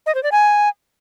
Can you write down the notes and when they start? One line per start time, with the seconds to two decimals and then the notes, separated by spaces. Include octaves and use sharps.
0.06 D#5
0.15 C5
0.23 D5
0.32 G#5